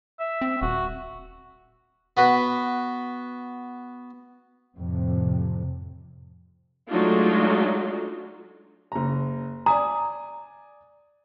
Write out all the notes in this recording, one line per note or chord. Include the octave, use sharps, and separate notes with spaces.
E5
C4
D#1 F#4
B3 F#4 B4
F2 A2 C3
F#3 G#3 A3 D4 D#4 F4
F#1 A#5
D5 G#5 A#5 D#6